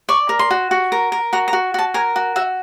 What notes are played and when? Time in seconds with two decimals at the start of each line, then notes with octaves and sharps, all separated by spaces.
0.09 D5 C#6
0.29 A#4
0.39 C6
0.51 F#4
0.71 F#4
0.92 A#4
1.12 A#4
1.33 F#4 A#5
1.48 A#5
1.53 F#4
1.74 F#4 A5
1.94 A#4 G#5
2.16 F#4
2.36 F#4 E5